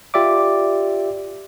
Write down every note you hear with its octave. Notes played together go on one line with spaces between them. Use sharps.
F4 G4 D5 E5 D6